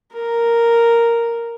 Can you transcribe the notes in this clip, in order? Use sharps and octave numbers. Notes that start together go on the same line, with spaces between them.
A#4